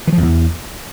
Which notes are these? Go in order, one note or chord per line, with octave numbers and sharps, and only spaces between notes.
E3
F3
F2
E2